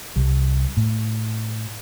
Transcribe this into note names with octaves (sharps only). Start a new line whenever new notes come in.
C2 G3
A2